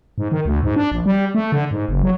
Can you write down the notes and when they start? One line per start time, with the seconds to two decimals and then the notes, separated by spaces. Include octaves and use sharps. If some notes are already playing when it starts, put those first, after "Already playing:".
0.18 G#2
0.32 D#3
0.46 D2
0.63 G#2
0.76 D4
0.92 A#1
1.06 G3
1.35 A3
1.52 D3
1.71 G#2
1.89 F#1
2.03 F#3